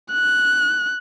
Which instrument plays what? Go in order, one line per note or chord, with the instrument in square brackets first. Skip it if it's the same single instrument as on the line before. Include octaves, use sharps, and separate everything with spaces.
[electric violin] F#6